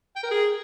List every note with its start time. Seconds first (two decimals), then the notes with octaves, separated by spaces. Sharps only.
0.16 G5
0.24 A#4
0.31 G#4